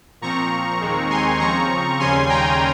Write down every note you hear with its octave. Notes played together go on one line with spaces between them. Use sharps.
A#2 F3 C4 A#5 C#6
D#2 D#3 G#3 C4
G#5 C6
C#3 F3 C4 A#5 C#6
D#2 C#3 G3 C#4 G#5 C6
G5 A#5